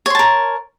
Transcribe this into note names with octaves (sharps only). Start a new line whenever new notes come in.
A#4 C#5 A5 C6